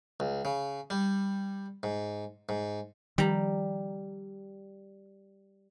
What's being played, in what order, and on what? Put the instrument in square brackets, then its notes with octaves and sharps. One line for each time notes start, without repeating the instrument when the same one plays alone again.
[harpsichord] C#2
C#3
G3
G#2
G#2
[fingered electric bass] D#3 F3 [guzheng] G3 A#5